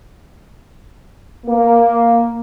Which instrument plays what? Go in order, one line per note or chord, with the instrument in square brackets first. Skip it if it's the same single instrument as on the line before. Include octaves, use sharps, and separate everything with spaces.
[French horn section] A#3